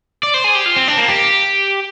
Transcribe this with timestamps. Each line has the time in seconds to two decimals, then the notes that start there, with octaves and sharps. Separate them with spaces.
0.23 D5
0.34 C5
0.44 G#4
0.55 G4
0.66 F4
0.76 C4
0.88 D4
0.98 A#3
1.08 G4